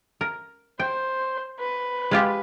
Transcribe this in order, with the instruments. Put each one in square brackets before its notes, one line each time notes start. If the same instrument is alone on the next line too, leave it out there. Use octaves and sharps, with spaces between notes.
[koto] A#4
[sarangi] C5 [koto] G5
[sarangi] B4
[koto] G#3 F4 G4